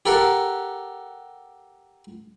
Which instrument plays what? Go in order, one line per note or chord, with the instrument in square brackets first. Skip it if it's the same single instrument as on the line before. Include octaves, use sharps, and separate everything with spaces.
[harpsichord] G4 A4 A#4 F5 F#5